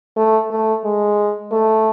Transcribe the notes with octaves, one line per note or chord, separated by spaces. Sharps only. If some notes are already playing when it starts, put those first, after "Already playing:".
A3
A3
G#3
A3